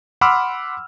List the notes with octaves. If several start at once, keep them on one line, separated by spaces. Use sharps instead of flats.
F#5 B5 C6 D6 E6 F6